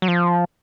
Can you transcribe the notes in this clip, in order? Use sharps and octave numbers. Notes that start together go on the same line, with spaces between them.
F#3
F3